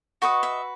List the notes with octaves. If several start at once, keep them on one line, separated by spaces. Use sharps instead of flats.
F#4 B4 D#5 C#6
E5